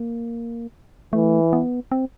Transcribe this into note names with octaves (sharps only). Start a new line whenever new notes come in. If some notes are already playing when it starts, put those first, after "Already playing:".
Already playing: A#3
E3 A3
B3
C4